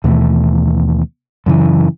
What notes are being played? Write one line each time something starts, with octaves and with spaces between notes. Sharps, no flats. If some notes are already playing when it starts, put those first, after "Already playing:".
D#2 B2 E3 A3
F#2 C#3 E3